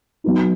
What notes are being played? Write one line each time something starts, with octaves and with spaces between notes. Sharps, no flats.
F#3 B3 D#4